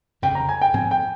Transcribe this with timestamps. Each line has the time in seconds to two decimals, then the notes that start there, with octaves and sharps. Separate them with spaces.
0.22 G1 F2 C#3 F3 G5
0.35 A#5
0.49 G#5
0.62 G5
0.73 G#2 F3 C4 G#5
0.91 G5